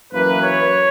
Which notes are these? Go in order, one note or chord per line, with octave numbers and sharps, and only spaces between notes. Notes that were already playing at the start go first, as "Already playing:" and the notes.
F#2 E3 A#3 B4
C#5